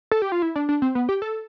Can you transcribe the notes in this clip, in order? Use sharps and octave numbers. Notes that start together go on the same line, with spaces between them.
A4
G4
F4
E4
D4
D4
C4
B3
G4
A4